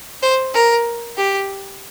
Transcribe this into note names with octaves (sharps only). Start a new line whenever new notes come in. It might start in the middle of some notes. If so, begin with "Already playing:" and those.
C5
A#4
G4